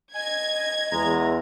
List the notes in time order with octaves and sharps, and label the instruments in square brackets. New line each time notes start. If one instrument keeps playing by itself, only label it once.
[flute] D#5 [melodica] G#5 [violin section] G#6
[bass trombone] E2 [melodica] G#3 A#5